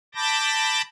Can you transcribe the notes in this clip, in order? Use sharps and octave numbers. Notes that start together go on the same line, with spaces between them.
A5 B5 D6 G6 A6 A#6